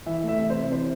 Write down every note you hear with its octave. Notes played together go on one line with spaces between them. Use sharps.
E3 E5
A3 E5
C3
C5
C3
E3 C5